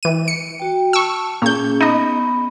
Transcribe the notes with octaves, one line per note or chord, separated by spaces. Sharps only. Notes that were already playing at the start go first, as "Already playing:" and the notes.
E3 D#7
C#7
F#4 G5
A5 C#6 E6
A#2 C#4 G#4 G6
B3 D#4 D#5 B5